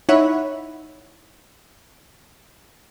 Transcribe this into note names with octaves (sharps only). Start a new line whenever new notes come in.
D#4 E4 C#5 E5 F#5 B5